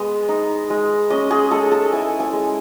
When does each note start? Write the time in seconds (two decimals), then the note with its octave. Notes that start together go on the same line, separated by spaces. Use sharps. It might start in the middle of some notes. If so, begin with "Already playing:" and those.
Already playing: G#3 B3 D#5
0.29 D#4
0.70 G#3
1.10 C#4 D#5
1.31 G#4
1.51 G#3 A4
1.72 A4
1.93 E4 G#5
2.20 G#5
2.33 G#3